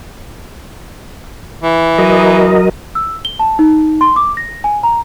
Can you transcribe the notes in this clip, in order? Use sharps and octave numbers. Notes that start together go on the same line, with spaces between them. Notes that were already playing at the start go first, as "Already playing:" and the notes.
E3
F#3 A#4 D#5
E6
G7
A5
D#4
C6
D6
A#6
G#5
A#5